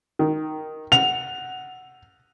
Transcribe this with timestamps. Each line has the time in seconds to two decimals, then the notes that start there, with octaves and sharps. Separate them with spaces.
0.19 D#3
0.92 F#5 F7